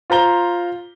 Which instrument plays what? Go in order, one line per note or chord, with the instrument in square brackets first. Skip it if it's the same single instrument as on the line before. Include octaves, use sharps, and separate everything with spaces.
[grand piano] F4 C5 A#5 G7